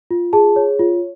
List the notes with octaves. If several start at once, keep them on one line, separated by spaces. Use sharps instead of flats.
F4
G#4 A5
C#5
F4